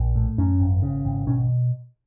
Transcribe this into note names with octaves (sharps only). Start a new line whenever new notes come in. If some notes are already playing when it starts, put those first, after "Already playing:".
Already playing: A#1
A2
F#2 C#4
G#1
C#3
G#1
B2 C#4